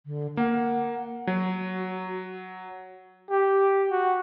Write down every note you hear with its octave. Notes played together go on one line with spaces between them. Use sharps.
D3
A#3 F#5
F#3 F#4
G4
F#4